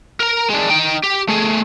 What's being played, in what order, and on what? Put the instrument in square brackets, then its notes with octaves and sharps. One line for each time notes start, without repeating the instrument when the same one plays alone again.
[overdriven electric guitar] A#4 A#5
G#3 D4
D#4 G5
G4
A3 G#4